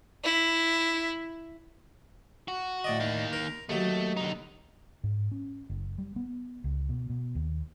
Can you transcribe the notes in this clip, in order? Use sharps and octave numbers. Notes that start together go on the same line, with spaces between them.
E4
F#4
A2 D5 D#5
D#3 A#3
A#4
D#2 F#3 A3
D3 D#4
G#2
C#4
F#1
G3
B3
C#2
B2
B2
D#2